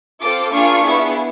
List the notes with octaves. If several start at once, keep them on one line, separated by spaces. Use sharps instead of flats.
C4 F4 A4 D6
A#3 D4 F4 G#4 C#6
B3 E4 G#4